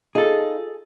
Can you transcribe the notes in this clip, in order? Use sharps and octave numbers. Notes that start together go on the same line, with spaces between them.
D#4 F4 G#4 A4 D#5